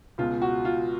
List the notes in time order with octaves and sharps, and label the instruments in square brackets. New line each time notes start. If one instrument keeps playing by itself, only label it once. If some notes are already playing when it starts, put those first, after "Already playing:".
[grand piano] C#2 B2 G#3 F4
F#4
F4